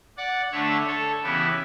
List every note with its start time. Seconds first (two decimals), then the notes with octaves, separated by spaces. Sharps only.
0.17 D5 F#5
0.52 D3 A3 D4 C#5 E5
0.87 A4 C#5
1.23 C#3 E3 B3 E4 G4 B4